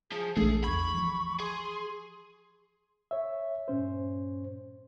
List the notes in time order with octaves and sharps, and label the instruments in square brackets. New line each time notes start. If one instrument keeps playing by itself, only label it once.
[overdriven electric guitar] F3 [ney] G#4
[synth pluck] A#1 A3 [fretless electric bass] E3 G#3 D4 [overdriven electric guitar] G#4 [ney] A4
[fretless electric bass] D1 E2 [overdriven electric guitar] B5 [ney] C#6 [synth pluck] G#6
[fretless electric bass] E3 F3
[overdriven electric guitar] G#4 [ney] C6
[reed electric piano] C#5 E5
G2 A#2 C#4 C5